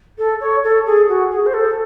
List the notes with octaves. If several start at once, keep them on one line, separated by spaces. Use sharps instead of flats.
A4
C#5
A4
G#4
F#4
G#4
C5
A4